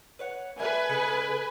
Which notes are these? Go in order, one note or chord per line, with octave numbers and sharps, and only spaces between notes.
B4 C#5 F#5
G3 B4 E5 G#5 A5
C#3 G#3 A4